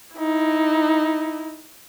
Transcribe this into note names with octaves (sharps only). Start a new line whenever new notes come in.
D#4 E4